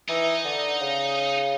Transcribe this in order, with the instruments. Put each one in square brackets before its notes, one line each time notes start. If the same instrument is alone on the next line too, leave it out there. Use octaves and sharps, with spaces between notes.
[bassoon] E3 [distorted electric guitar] D#4
[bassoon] D3
C#3